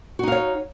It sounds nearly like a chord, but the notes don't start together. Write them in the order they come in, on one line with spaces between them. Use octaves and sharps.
F#4 D#4 F5 C#5